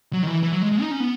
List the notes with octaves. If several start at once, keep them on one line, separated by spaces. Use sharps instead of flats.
F#3
D#3
E3
E3
F#3
G#3
G#3
D#4
C#4
B3